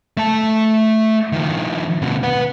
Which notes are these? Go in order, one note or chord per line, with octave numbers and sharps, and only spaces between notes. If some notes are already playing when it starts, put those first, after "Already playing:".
A3 A5
D#3 F3
D2 B2
B4 F#5